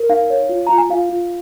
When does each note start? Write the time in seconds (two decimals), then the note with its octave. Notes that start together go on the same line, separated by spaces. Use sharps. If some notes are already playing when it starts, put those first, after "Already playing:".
Already playing: A#4
0.09 D#4 F5
0.30 C#5
0.49 F4
0.67 F4 A#5
0.78 G#5
0.90 F4 F5
1.09 F4